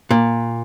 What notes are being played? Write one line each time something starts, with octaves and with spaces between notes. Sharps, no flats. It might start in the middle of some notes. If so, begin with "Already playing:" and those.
A#2